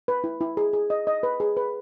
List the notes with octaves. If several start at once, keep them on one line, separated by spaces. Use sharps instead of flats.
B4
E4
E4
G#4
G#4
D#5
D#5
B4
G#4
B4